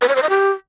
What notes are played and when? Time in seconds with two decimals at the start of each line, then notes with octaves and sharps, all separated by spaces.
0.02 B4
0.09 C#5
0.15 C5
0.22 D#5
0.29 G4